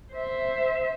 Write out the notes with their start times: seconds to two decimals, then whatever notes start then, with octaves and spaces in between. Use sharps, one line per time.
0.14 C5 E5